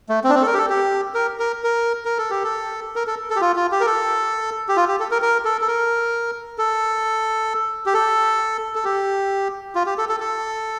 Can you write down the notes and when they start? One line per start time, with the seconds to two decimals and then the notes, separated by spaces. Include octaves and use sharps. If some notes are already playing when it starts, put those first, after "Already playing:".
0.09 A3
0.24 C4
0.30 D4
0.35 C4
0.42 A4
0.46 A#4
0.54 G4
0.58 A4
0.69 G4
1.14 A#4
1.40 A#4
1.64 A#4
2.05 A#4
2.18 A4
2.30 G4
2.44 A4
2.96 A#4
3.07 A4
3.30 A4
3.36 G4
3.41 F4
3.56 F4
3.72 G4
3.81 A#4
3.87 A4
4.69 G4
4.77 F4
4.88 G4
5.00 A4
5.11 A#4
5.22 A#4
5.45 A4
5.61 A4
5.67 A#4
6.58 A4
7.86 G4
7.94 A4
8.75 A4
8.85 G4
9.75 F4
9.86 G4
9.98 A4
10.09 A4
10.20 A4